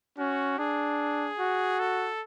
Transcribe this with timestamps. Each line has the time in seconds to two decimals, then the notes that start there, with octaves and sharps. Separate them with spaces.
0.18 C#4 F#4
0.58 D4 G#4
1.39 F#4
1.80 A4